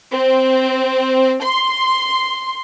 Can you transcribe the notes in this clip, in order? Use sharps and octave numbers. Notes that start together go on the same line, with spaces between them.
C4
C6